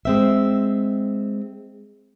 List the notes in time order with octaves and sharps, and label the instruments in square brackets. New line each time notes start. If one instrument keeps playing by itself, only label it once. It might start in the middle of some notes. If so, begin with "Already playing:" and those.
[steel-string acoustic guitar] G#3 C4 E5